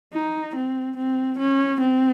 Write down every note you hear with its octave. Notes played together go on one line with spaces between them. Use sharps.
D#4
C4
C4
C#4
C4